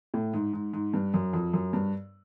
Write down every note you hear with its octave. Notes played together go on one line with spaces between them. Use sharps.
A2
G#2
G#2
G#2
G2
F#2
F2
F#2
G2